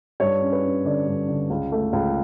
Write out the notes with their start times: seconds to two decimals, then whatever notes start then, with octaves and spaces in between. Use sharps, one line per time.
0.20 G2 C#5
0.42 C#4
0.52 B4
0.64 C#4
0.85 D3 D5
1.07 G2
1.28 D3
1.50 C#2
1.72 A3
1.93 C#2